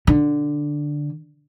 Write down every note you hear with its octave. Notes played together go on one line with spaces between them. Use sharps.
D3